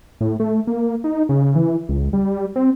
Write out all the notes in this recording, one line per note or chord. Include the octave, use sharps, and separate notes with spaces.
A2
A3
A#3
D#4
C#3
E3
C#2
G3
C4